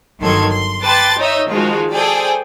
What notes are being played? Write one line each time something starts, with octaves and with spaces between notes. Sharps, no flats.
G1 D#3 F#3 A4 C6 G#6
C6
B4 G5 A5 C6 D6 A6
D#4 C#5 D#5 E5
D#3 F3 G#3 F4 F#4
G#4 A4 C5 D5 G5 G#5